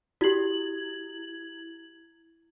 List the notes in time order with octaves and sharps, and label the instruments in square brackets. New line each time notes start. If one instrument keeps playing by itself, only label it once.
[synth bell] E4 G#6 F#7 [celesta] F#4 G4